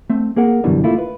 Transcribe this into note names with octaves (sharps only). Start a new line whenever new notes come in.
A3 C4
A#3 G#4 A#4 F#5
F#2 B2 D3 E3 F#3 G3
A3 A#3 E4 F4
B4